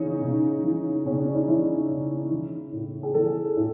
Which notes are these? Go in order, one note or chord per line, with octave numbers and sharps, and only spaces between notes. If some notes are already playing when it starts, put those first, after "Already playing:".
Already playing: C#3 E3 C#4 D#4
C#3
E3
C#3 C#4
D4
D#4
E3 E4
C#3
E3
A2
G#4
E3 A4
A2